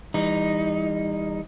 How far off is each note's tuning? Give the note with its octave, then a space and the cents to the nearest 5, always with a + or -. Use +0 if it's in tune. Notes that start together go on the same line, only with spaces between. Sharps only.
E3 +0 G3 +35 D#4 +0